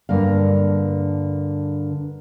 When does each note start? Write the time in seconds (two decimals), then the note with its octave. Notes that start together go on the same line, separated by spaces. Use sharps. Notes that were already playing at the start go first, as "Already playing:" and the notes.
0.09 G2 D3 A#3 F5